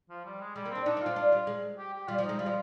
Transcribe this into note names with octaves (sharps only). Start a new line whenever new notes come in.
F3
G3
G#3
G3 G#3
A#3
C4 D4
D4 D#4
D#4
C4 F4
D4
G3
G#3
G4
G4
G3 F4
F3
G#3 D#4
G3 F4
F3